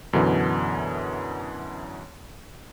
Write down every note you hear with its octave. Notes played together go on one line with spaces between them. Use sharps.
F#2 B2 D3 E3